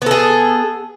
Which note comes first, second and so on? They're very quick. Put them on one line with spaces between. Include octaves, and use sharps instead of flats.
B3 A4 G#4